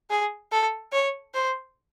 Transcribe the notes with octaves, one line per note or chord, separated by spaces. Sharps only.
G#4
A4
C#5
C5